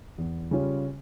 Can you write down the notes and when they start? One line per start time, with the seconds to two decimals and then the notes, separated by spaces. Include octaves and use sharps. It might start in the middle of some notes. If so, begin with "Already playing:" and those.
0.18 E2
0.51 C#3 G3 C#4 F4